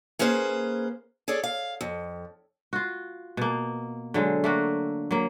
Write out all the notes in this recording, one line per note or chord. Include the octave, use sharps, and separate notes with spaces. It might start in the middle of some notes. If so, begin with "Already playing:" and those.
A#3 C#4 G#4 B4 C5
G#4 A4 C#5 D5
F5
F2
F4 F#4
B2 A#3
D3 F#3 G#3
A3 A#3 F#4
F#3 A#3